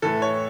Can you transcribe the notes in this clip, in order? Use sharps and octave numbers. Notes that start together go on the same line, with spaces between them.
A2 E3 A4
C#5